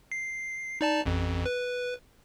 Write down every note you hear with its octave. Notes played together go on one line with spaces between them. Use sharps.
C7
D#4 D5 A5
A1 F2
B4